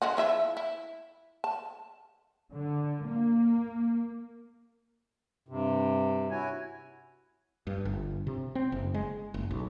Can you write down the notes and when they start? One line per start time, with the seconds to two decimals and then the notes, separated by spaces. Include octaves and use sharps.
0.02 D3 G#3 F#4
0.17 F3 E4 E5
0.57 E4
1.44 A5
2.53 D3
3.06 A#3
5.48 G2 C3
6.31 E4 F#4 C#5 G#5
7.67 G2
7.85 G1
8.27 C3
8.55 C4
8.72 F#1
8.94 G#3
9.34 F#1
9.51 B1